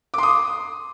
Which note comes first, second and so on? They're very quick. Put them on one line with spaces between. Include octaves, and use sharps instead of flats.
D6 C6 D#6